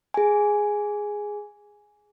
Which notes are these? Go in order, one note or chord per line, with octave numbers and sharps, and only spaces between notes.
G#4 G#5